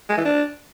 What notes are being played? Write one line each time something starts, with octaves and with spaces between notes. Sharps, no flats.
G#3
E3
D4